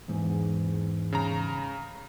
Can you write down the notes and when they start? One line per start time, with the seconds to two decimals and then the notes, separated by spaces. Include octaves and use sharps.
0.08 E2 G#2
1.12 C#3 A#5